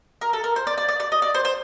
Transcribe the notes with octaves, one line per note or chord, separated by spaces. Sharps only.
A#4
A4
A#4
C5
D5
D5
D5
D5
D#5
D5
C5
C5